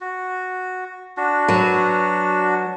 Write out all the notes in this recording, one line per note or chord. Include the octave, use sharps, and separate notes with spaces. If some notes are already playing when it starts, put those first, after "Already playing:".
F#4
D4 F#4
F#3 B4